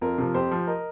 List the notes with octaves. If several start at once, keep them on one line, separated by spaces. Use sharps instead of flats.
F2 F4 A#4
C3 F3
F2 G4 C5
F3
A#4 D#5